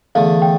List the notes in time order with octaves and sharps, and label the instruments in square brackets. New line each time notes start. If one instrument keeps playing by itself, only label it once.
[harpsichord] E2 D3 A3 [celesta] F5
[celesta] G5